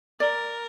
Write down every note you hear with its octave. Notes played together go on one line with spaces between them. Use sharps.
A#4 D5